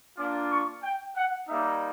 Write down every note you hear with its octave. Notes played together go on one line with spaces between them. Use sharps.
A#3 D4 F4 D6
C#6
G5
F#5
G3 A#3 D#4 E5